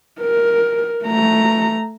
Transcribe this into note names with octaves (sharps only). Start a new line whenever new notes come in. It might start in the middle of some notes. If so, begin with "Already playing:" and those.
A#4
A3 A#5